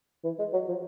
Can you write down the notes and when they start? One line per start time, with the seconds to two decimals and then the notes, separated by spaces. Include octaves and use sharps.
0.24 E3
0.39 G#3
0.53 F#3
0.68 F3